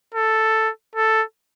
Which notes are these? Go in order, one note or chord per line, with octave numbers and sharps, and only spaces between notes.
A4
A4